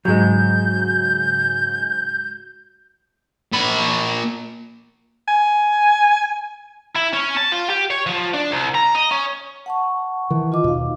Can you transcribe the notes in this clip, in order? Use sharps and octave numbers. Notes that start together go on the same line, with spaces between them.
G#2 C#3 F#3 G#3 G6
A#2 B5
G#5
E4
C#4
A5
F4
G4
C#5
F3
D4
C2
A#5
D#5
C#4
F#5 A5 C#6
D#3 E3
F4 D#5 D6
D#2 B2 D#4 F5